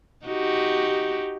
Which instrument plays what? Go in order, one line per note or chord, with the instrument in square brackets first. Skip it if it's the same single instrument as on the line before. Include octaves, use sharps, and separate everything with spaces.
[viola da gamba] D#4 F#4 G4